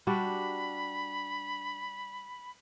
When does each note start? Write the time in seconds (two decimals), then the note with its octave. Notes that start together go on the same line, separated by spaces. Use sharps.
0.07 G3 D4 F#4 B5